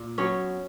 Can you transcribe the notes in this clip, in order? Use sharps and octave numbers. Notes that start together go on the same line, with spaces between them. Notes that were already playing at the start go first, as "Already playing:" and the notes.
Already playing: A#2
F#3 B3 C#4 C#5